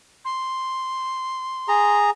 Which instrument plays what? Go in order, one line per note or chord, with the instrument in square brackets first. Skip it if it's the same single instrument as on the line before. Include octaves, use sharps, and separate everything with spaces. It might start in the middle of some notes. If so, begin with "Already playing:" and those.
[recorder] C6
[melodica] G#4 A#5